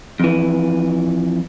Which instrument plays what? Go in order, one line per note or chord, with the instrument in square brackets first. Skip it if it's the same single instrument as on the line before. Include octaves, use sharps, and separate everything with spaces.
[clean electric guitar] F2 E3